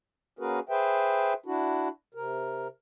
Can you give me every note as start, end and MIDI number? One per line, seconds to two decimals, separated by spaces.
0.39 0.59 58
0.39 0.59 61
0.39 0.59 66
0.39 0.59 68
0.39 0.59 70
0.39 0.59 71
0.69 1.33 68
0.69 1.33 71
0.69 1.33 72
0.69 1.33 76
0.69 1.33 79
1.46 1.88 62
1.46 1.88 64
1.46 1.88 66
2.14 2.68 48
2.14 2.68 70